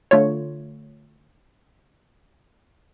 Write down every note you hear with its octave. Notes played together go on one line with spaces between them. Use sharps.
D3 A3 F4 C#5